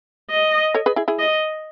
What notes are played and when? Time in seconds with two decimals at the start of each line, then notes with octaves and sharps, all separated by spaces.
0.30 D#5
0.74 A4 C#5
0.86 G#4 B4
0.96 E4 G#4
1.08 E4 G#4
1.19 D#5